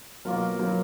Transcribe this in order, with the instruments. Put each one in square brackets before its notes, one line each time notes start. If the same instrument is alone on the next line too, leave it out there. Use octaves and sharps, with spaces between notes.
[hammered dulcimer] B2 A#3 F4 A#4 [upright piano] F#3
[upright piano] F#3